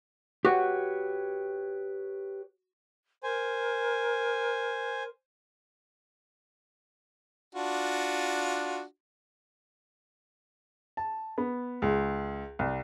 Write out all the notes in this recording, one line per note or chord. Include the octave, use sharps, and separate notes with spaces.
F#4 G4 B4 C#5
A#4 C5 G#5
D4 F4 F#4
A5
B3
C#2
C2